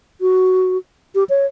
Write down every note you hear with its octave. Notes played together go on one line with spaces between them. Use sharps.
F#4
G4
C#5